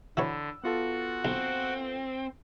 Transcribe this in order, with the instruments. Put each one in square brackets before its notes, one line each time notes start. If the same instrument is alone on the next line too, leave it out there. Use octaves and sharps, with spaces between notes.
[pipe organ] D3 [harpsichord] E3 F#3 C#5 [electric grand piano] B5 E6
[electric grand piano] B3 F4 A4 [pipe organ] F#4 F#5
[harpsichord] B1 [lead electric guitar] C4